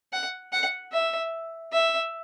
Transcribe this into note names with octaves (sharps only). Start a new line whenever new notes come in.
F#5
F#5
E5
E5